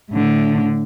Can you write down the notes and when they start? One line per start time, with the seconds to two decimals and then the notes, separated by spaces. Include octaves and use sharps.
0.11 A2 D3